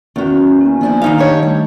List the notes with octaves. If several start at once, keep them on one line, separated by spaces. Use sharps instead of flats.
E2 D#3 C#4 F#4
A#3 B3 G#5
F3 D4 E4
D#3 D#4 F5
D4 G4 C#5 D#5 E5 A5
G3 A3